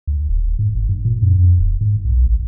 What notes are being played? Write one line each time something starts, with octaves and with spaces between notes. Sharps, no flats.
D2
D#1
G#2
G1
G2
A#2
F#2
F2
D#1
G#2
B1
G#1